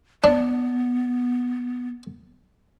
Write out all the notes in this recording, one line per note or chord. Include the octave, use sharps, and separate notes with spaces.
B3 D4